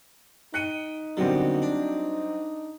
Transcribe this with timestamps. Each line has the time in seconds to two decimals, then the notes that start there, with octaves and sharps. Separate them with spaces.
0.54 D#4 G5 F#6 C#7 D#7
1.17 D#2 B2 D3 F#3 G3 C4
1.62 D4